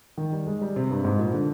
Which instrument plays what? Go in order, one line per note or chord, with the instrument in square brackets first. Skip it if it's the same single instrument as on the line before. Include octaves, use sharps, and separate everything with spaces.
[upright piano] D#3
G3
G#3
G3
C3
G2
G#2
A#2
D3